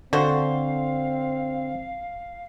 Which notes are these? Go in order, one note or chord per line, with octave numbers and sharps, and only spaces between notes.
D3 C4 F#4 A4 C5 F5